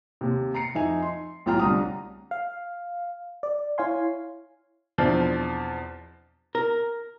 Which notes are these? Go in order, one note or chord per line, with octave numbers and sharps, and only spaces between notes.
D#2 C3
A#5 C7 C#7
F2 D#4 E5 G#5
C6
B1 A2 F4 G5 A#5 F6
C2 D3 A#5 D#6
F5
D5
E4 C#5 F5 G#5 C6
E2 B2 F3 C4 D4 E4
A#4